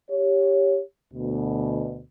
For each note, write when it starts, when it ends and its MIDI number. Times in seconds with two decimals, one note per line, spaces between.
0.11 0.81 67
0.11 0.81 73
1.14 2.01 38
1.14 2.01 47